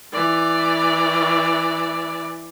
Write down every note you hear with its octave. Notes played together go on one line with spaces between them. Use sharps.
E3 D5